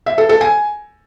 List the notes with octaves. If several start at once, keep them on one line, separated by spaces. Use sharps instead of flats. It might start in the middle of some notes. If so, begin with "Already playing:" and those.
E5
A4
A4
G#5